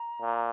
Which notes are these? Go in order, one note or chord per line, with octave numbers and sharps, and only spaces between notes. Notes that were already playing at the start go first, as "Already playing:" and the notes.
Already playing: A#5
A#2